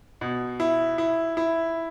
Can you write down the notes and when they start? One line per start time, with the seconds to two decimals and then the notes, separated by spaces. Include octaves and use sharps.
0.21 B2
0.60 E4
0.98 E4
1.37 E4